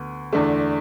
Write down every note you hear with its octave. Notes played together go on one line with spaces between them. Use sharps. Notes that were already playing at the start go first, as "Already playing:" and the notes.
Already playing: D2 B3
E2 D3 A3 D4